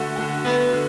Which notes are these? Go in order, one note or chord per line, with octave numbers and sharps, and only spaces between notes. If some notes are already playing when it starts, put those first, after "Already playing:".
Already playing: D3 A3 F#4
D3 A3 F#4
D3 A3 B3 F#4
D3